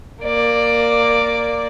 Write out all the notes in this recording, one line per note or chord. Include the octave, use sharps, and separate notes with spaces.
A#3 D5